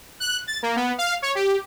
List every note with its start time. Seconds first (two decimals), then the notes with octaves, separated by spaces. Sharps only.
0.20 F#6
0.47 A6
0.63 A#3
0.76 B3
0.98 F5
1.22 C#5
1.35 G4